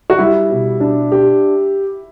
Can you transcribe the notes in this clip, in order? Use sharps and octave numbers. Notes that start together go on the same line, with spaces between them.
F#4
G3 E4
B2
D4
G4